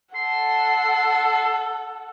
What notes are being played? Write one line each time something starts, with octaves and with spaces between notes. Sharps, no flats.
A4 F#5 C6